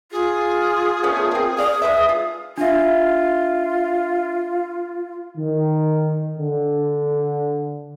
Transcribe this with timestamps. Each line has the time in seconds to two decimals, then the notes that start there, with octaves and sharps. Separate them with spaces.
0.12 F4 G#4
1.03 A3 B3 C#4
1.31 A#3 C4
1.58 D5 F5 D#6
1.82 G#3 B4 E5
2.09 F4
2.58 D4 F4 E5
5.37 D#3
6.37 D3